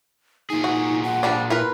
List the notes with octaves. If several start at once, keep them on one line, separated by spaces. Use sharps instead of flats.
A#2 D#4 G#4
F#4
F#5
F3 G3 D4
E4 F4 A#4 B4